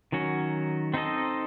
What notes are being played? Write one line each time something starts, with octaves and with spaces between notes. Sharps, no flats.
D#3 F#3 C#4 F#4
C4 D#4 A4 D#5